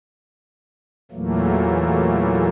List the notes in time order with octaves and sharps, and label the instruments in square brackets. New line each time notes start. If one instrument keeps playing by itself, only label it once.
[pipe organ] E2 A#2 E3 F#3 A3 A#3